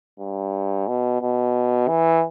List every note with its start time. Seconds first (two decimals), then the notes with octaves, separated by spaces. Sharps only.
0.19 G2
0.88 B2
1.21 B2
1.88 E3